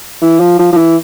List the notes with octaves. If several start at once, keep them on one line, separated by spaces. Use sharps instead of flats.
E3
F3
F3
F3
E3